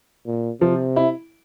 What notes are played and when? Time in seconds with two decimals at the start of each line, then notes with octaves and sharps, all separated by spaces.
0.26 A#2
0.61 C3 F3
0.96 E4